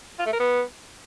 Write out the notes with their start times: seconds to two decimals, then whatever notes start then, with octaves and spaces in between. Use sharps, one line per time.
0.19 F4
0.26 A3
0.33 A#4
0.40 B3